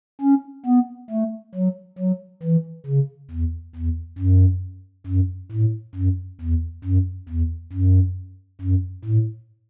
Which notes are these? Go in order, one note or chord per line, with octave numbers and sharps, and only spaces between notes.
C#4
B3
A3
F#3
F#3
E3
C#3
E2
E2
F#2
F#2
A2
F#2
E2
F#2
E2
F#2
F#2
A2